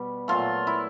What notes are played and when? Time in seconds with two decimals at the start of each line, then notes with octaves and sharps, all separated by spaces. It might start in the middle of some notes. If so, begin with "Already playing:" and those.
Already playing: B2 G3
0.28 A#2 F#3 A3 F4
0.67 E4